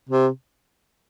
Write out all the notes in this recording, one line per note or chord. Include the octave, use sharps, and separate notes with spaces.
C3